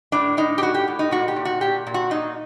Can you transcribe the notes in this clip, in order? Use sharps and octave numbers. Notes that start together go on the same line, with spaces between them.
A2 D4
A2 D#4
G4
A2 F#4
G4
A2
D#4
A#2 F#4
G4
A#2
F#4
A#2 G4
A#2
F#4
A#2 D#4